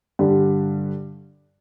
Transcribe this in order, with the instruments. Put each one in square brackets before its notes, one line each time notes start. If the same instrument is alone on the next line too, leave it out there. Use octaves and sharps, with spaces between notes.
[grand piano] G2 D3 G3